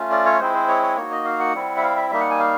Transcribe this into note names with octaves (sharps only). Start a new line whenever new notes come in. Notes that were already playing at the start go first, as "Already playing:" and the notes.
Already playing: A3 C#4 F4
D5
C#5
G#3 C4 E4 C5
C5
C#5
C#5
A#3 D#4 F#4 C#5
D#5
F5
F#5
G3 C4 E4
E5
F5
E5
G3 A#3 D#4 E5
F#5
G#5
F5